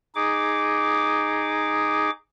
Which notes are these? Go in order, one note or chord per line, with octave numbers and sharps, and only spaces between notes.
D#4 G#4 D6